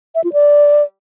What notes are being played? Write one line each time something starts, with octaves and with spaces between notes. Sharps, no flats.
E5
F4
D5